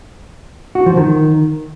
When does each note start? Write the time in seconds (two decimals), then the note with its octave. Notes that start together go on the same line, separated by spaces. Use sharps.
0.75 F#4
0.86 F3
0.97 D#3